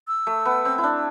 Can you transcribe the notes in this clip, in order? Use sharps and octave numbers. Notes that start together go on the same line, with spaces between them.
E6
A3
B3
C4
E4
D4